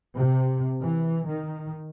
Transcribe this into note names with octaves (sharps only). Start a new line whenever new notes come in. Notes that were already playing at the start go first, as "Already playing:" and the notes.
C3
E3
D#3